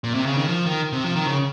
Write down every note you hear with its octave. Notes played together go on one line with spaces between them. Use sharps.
A#2
C3
C#3
D#3
F3
D#3
C3
F3
D#3
C#3